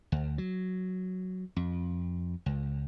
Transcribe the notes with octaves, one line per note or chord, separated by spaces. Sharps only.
D2
F#3
F2
C#2